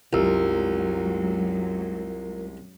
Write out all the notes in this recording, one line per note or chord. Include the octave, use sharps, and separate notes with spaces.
C2 F#2 F#3 G#3 F4 A#4 E6